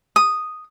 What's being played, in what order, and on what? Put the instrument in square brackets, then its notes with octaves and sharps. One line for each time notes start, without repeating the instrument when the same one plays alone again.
[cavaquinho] D#6